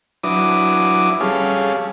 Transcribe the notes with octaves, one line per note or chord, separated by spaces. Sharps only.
F#3 D4 E4 B4 D6 D#6
G3 C#4 G#4 A4 F5